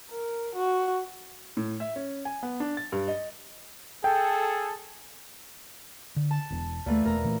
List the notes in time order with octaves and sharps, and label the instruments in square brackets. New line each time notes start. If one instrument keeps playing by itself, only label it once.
[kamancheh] A#4
F#4
[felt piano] A2
E5
C#4
G#5
B3
D4
A6
G2
D#5
[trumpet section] G#4 A4 [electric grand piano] G5
[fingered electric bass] D3
[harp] A5
[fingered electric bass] E1 E2
[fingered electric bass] D2 [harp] A#2 E3 A3
[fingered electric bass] E1 [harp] A#4 A#5
[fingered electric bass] A#2 E3 A3